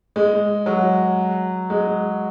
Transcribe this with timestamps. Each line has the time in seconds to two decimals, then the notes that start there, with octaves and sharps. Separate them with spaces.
0.16 G#3
0.66 F#3
1.70 G#3